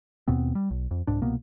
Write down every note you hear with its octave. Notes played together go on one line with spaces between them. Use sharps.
D#2 B2 B3 C4
G3
B1
F2
C2 G#2 D4
C2 B2 A#3 B3